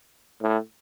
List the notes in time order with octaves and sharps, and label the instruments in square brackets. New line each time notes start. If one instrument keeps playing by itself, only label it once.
[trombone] A2